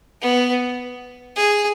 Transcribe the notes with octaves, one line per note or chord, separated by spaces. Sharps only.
B3
G#4